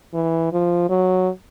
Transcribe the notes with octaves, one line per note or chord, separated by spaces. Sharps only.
E3
F3
F#3